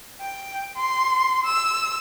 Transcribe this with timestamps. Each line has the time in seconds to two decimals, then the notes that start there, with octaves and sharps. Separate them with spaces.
0.21 G5
0.76 C6
1.45 E6